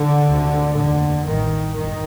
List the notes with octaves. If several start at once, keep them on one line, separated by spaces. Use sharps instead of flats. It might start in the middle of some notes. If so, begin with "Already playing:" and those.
Already playing: D3
D2 C3
F1 D#2 D3
A1 G2 D#3
G1 F2 D#3